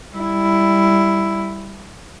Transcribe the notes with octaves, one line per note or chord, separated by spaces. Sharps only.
G3 E4